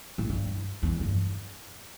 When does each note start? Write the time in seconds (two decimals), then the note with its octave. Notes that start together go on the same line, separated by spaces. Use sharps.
0.18 A2
0.29 G2
0.83 E2
1.00 G2